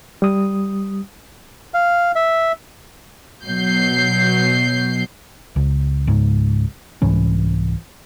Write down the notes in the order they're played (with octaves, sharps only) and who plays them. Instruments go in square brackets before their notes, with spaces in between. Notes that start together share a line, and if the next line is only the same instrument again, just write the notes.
[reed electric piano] G3 D#6
[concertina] F5
E5
[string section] B2 F#3 G6 C7
[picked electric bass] C#2
C#2 G#2
C2 G#2 E3 C#4